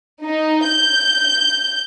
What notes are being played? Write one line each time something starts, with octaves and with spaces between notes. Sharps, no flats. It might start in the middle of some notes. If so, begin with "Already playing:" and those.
D#4
G6